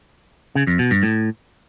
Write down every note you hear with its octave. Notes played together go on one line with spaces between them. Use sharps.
C#3
F2
B2
G2
A2